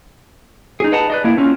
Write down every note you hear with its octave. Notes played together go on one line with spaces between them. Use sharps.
D#4 G#4
B4 D#5 F#5 A5 A#5
B4 D5 D#5
A#3 E4
C4 C#4 F4